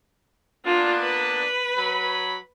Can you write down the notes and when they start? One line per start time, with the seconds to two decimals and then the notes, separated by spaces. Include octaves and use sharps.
0.65 A#3 B3 D4 F4
1.03 B4
1.76 F#3 B5